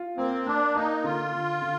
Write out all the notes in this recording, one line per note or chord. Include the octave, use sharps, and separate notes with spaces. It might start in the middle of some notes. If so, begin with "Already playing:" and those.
Already playing: F4
A#3 C4
A#3 D4
A#3 D#4
D3 F4
D3
D3